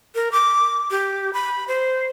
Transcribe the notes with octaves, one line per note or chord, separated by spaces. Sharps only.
A#4
D6
G4
B5
C5